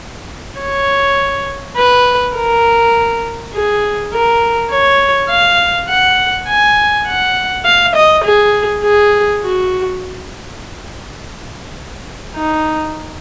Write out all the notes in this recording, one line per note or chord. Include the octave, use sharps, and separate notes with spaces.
C#5
B4
A#4
G#4
A#4
C#5
F5
F#5
G#5
F#5
F5
D#5
G#4
G#4
F#4
D#4